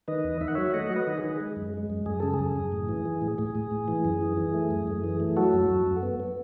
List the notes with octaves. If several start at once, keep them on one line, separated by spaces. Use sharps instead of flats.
D#3 B4 D#5
E2
D#3 E5
F#5
F#3 C#5 E5
A3 D#5 F#5
F#3
B4 D#5
D#3
G#4 B4
D#3
G#3
F#2
G#3
F#2
F#2 G#4
C#3 A4
G#4
F#2
F#2
A2
E3
E3
A2
A2 G#4
A2
A2
E3
F#2
E3
E3
A3
F#2
F#2
E3
A3
F#3 F#4 A4
F#2
F#2
F#2
B3
B3